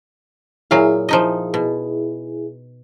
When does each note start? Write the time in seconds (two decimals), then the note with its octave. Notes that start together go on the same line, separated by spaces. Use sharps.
0.71 A#2 F#3 E4 G#4 F5
1.09 F3 D#4 D#5
1.54 B2